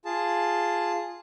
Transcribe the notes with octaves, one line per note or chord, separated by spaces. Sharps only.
F4 G#4 A5